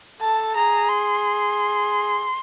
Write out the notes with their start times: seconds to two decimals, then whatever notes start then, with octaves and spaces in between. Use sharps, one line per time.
0.21 A4 A5
0.55 G#4 A#5
0.89 C6